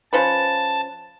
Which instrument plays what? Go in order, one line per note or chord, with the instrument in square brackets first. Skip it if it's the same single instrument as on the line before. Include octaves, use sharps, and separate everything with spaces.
[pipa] F3 C#4 B4 [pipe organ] A5